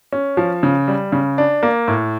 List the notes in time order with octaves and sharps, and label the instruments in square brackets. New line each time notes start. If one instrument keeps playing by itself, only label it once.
[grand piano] C#4
F3
C#3
G3
C#3
D4
A#3
A2